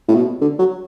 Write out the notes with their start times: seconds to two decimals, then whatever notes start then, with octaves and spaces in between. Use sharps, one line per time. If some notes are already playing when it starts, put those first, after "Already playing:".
0.08 A2
0.15 B2
0.41 D3
0.59 F#3